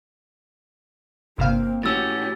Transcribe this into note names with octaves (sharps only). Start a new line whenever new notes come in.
G1 C3 A#3 C4 F5
A2 C#4 F#4 G4 E6 A6